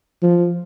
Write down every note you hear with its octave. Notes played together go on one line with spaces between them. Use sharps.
F3